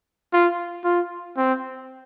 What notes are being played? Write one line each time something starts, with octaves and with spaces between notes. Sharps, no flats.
F4
F4
C4